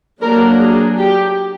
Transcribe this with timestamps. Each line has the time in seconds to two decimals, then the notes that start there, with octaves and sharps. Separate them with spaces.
0.21 F#3 A#3 D4 A#4
0.59 G#4
0.97 G4